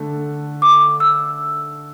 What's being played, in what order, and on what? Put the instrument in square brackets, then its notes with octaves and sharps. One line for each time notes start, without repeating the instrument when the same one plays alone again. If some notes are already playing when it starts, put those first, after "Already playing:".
Already playing: [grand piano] D3 A3
[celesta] D6
E6